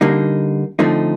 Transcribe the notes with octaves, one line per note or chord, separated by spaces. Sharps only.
D3 G3 A#3 D#4
D3 F3 A3 C4 D#4